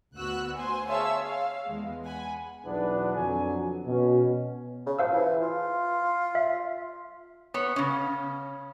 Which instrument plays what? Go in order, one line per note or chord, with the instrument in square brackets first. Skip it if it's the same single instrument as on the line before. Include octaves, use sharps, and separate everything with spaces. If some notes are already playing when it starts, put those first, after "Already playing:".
[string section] D2 B3 F#4 E6 F#6
C5 G#5 C6
G#4 C#5 E5 F5 A5 E6
F5
E2 G#3
F#5 G#5 B5
[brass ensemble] B1 E2 B3 D4 B4
F2 D3 F#3 G#5
B2 C#4
[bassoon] C#3
[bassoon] F3 [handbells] C5 F5 E6
[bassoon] E3
F4
[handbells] E5
[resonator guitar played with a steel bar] B3 C#5
C#3 C#4